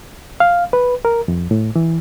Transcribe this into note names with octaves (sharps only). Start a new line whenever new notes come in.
F5
B4
A#4
F2
A2
E3